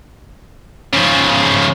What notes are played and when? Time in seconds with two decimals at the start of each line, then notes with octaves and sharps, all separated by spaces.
0.93 C#3 F3